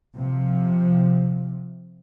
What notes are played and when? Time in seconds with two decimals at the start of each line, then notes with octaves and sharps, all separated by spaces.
0.14 C3 F3